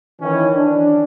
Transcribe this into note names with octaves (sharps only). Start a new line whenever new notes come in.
D#3 E3 C#4
D4